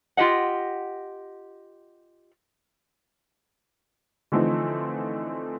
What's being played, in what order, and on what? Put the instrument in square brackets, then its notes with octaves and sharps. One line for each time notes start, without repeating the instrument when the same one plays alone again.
[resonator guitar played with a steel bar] F4 G4 D#5 F#5
[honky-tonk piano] D3 E3 F3 A3 C4 D#4